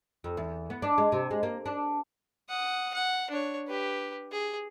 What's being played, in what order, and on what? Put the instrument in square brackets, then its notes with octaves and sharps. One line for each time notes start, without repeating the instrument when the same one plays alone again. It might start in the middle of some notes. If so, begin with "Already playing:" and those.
[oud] F2
E2
B3
D4
G#3
C3
G#3
A#3
D4
[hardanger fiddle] F#5 D#6
F#5
D4 C#5
G4 B4
G#4